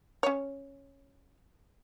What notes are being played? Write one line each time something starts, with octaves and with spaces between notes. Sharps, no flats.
C#4 C#5